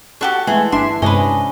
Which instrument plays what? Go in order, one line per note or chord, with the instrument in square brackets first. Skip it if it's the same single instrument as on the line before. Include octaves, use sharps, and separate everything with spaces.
[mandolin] D4 F#4 G4 [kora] A4 [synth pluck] C#6
[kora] E3 [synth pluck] G#3 A3 [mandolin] G#4 A4
[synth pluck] G1 D4 E5 [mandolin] C6
[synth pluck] G2 C3 G#3 [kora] C#4 D4 [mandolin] B4 D#5